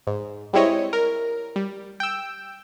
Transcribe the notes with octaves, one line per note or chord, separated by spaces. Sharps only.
G#2
G3 G#3 C4 E4 C#5 D#5
A#4
G3
G5 E6